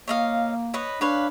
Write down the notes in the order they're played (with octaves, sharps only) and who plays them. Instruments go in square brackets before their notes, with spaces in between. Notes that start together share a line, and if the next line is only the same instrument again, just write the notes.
[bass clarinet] A#3 [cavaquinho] C#5 D#5 F5
[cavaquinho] B4 C#5 D#5
[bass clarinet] D4 [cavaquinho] B4 C#5 F5